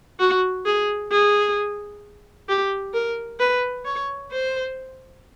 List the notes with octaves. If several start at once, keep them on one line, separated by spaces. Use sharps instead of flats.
F#4
G#4
G#4
G4
A#4
B4
C#5
C5